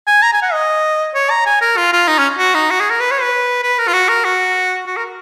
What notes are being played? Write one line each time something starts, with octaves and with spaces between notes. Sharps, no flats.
G#5
A#5
G#5
F#5
D#5
C#5
A#5
G#5
A#4
F4
F4
D#4
C#4
F#4
D#4
F#4
G#4
A#4
B4
C#5
B4
B4
A#4
F4
F#4
A#4
F#4
F#4
A#4